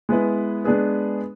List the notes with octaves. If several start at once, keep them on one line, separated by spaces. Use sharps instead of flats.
G#3 B3 E4 B4
G#3 B3 D4 G#4 B4